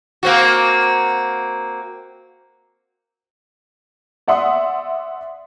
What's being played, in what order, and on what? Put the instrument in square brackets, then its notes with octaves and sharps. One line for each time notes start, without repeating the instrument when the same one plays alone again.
[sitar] A#3 C4 F#4
[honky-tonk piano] D5 E5 F#5 C6 D#6